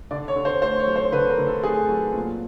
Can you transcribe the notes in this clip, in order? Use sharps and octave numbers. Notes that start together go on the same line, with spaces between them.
D3 D5
C#5
D3
C5
A3 C5
C#5
F#3
C5
D3 B4
A#4
D3
A4
A3 G#4
F#3
A#2